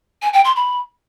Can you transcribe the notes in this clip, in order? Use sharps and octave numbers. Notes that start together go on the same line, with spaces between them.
G#5
G5
C6
B5